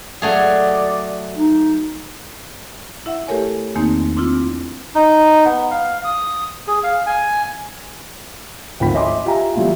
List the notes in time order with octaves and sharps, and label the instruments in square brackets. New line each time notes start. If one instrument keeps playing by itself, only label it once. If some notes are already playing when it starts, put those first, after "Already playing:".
[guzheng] F#3 A3 G#4 [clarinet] D5
[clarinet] D#4
[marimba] E4 E5 F#5
A3 G4 A4 A#4 C#5 G#5
E2 D#3 A3 A#3 C4 D#4
C4 D4 E4 F4
[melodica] D#4
B3
F5
D#6
G#4
F5
G#5
[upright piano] G#1 D2 F3 G5 B5 B6
C#5 D#5 E5 G#5 C6 D6
F4 G4 E5 G5 G#5 A#5
E3 F#3 G3 A3 E4 F4